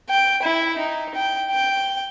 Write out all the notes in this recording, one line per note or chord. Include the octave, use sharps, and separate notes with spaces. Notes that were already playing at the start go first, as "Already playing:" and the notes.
G5
E4
D#4
G5
G5